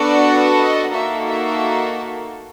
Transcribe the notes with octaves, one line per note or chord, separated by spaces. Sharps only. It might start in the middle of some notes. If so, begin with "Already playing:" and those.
Already playing: B3 D4 F#4 A4 D5
D#5
A#3 D#4 F#4 A4 E5
E5